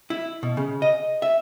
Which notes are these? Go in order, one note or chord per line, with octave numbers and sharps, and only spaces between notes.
E4
B2
C#3
D#5
E5